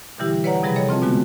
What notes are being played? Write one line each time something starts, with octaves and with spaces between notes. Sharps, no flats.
B2 D3 E3 G3 E4 G4
B4 C#5 D5 F#5 A#5
C3 F3 G3 G#4 B4 B5
A4 C#5 D#5
C4 F4 D#5 A5
B2 D3 G#3 B3 F#4